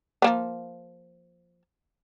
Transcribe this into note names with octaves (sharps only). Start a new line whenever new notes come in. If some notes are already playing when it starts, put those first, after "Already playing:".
F3 A#3 B3